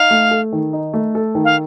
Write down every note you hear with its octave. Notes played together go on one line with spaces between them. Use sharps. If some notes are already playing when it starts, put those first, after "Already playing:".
Already playing: D#4 F5
A3
A4
D#3
D#4
A3
A4
D#3
F5